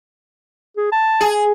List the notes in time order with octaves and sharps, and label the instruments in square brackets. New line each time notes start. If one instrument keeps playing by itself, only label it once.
[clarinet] G#4
A5
[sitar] G#4